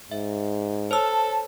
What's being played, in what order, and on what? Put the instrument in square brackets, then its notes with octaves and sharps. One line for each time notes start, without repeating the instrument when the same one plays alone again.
[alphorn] G#2 [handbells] E5
[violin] A4 [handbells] C5 C#5 E6 [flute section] A5